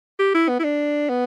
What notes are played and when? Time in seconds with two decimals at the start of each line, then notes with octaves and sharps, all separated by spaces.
0.19 G4
0.35 E4
0.49 B3
0.60 E4
0.64 D4
1.09 B3